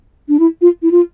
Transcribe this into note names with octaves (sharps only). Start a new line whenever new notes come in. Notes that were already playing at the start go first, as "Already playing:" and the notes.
D4
E4
F4
E4
F4